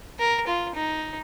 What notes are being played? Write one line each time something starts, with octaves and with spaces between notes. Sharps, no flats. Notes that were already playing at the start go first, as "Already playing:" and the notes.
A#4
F4
D#4